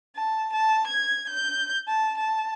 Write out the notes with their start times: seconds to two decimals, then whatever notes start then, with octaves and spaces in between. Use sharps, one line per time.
0.16 A5
0.53 A5
0.87 G#6
1.29 G6
1.88 A5
2.17 A5